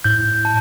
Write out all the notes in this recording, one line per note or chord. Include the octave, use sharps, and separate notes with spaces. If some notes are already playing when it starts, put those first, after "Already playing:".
A2 G6
A5